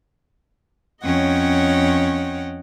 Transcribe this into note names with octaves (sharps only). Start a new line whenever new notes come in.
F2 C#4 C#5 D#5 F#5 G5